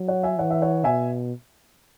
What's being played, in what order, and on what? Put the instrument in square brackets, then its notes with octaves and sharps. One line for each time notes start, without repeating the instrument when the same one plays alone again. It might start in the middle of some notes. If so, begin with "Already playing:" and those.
Already playing: [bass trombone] F#3
[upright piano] C#5 F#5
E5 G#5
[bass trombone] E3 [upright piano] C#5 F#5
[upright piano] E5
C#5 F#5
[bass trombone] B2 [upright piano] E5 G#5